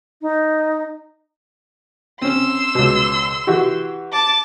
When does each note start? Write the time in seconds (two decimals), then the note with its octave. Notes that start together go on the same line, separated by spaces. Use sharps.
0.22 D#4
2.22 C4 C#4 C6 E6
2.75 C#2 B2
3.47 E3 F#4 G4
4.12 A5 D6